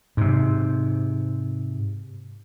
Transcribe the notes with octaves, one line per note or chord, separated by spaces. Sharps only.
G#2 C3